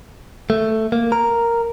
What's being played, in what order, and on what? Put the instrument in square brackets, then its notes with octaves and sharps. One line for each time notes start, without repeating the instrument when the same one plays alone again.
[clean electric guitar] A3
A#3
A#4